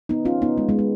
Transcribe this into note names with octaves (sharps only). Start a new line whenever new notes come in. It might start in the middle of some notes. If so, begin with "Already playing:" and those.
B3 D#4
C#4 F4
B3 D#4
G#3 B3
G#3 B3
G#3